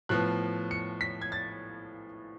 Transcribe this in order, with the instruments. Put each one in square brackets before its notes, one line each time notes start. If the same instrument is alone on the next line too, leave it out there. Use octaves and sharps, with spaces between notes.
[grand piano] A2 F3 B3 F#6
C#7
B6
G#6
A6